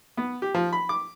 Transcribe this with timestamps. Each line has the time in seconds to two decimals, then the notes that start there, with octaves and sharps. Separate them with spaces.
0.17 B3
0.42 G4
0.54 F3
0.73 B5
0.89 D6